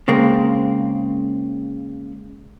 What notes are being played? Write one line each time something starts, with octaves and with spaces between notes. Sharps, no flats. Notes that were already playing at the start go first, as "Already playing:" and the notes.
C#3 G#3 A#3 C4